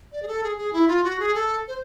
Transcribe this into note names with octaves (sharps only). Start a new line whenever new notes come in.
D5
G#4
A4
G#4
G#4
E4
F4
F#4
G#4
A4
C5